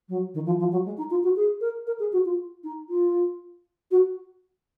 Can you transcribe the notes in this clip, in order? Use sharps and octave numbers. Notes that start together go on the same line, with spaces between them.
F#3
D#3
F3
F3
F#3
G#3
D#4
F4
F#4
G#4
A#4
A#4
G#4
F#4
F4
D#4
F4
F#4